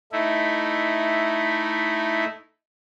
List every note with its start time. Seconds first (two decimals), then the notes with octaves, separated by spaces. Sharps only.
0.12 A3 D#4 E4